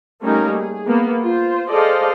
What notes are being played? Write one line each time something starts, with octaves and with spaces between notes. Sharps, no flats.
G3 A3 A#3 C#4 D#4 A#4
G#4
A#3 B3
F4 C5
G#4 A4 C5 D5 D#5 F5